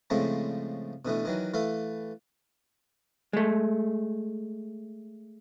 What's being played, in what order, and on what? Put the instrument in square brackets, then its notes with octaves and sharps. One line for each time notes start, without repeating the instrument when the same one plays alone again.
[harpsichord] A2 C#3 F3 G#3 A3 C4
B2 D3 E3 A3
D#3 E3 F#3
E3 A3 A4 F5
[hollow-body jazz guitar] G#3 A3